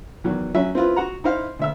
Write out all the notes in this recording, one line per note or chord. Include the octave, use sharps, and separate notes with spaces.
E2 D#3 F#3
F#3 C#4 E5
C4 E4 F4 B4
F#4 F#5 A#5
D#4 E4 C5 F5
D2 E5 E6